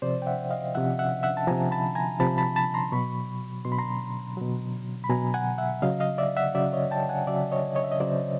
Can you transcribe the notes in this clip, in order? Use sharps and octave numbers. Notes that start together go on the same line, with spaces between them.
C3 F3 C5 D5
G5
E5 F#5
D#5 F5
C3 F3 E5 F#5
E5 F#5
E5 F#5
A5
C3 F3 G#5 A#5
A5 B5
G#5 A#5
C3 F3 A5 B5
A5 B5
A5 B5
A#5 C6
B2 F#3 B5 C#6
B2 F#3 C6
B5
A#5 C6
B2 F#3
B5
B2 F#3 G#5 A#5
F#5 G#5
E5 F#5
C#3 F#3 D#5 F5
D#5 F5
D5 E5
E5 F#5
C#3 F#3 D5 E5
C#5 D#5
G5 A5
F#5 G#5
C#3 F#3 D5 E5
C#5 D#5
C#5 D#5
E5
D#5
C#3 F#3 C5 D5